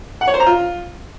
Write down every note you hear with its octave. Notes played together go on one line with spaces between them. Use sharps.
F#5
C#5
C5
A#5
F4